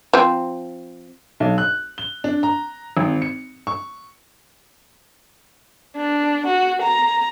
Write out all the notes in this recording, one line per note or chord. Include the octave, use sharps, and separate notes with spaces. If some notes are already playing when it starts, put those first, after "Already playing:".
F3 C4
B1
F#6
G7
D4
A#5
G#1
C#7
C#6
D4
F#4
A#5